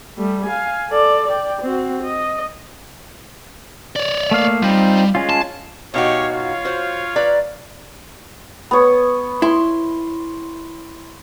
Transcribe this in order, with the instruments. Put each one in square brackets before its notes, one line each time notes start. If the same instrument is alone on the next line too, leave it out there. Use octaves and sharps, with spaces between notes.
[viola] G3 A3
F5 G#5
A4 D5
D5 G5
C4 F#4
D#5
[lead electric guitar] C#5 D5
[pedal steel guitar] A3 A#3 F5
[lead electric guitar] G3 [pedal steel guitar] C4 D#4 F4
[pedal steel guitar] G#3 C#4 F4
[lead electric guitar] A5
[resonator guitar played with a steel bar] B2 D#4 F#4 [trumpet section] G4 C#5 F5
[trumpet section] F4 C#5 F5
[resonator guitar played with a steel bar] F#4 C5
B4 D5 A#5
[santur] B3 C#5
[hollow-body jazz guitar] E4 [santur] C6